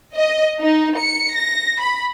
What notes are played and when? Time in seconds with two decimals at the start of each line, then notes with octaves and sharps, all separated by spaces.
0.14 D#5
0.60 D#4
0.98 C#7
1.34 A#6
1.81 B5